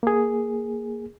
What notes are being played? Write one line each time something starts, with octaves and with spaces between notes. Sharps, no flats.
A#3 G#4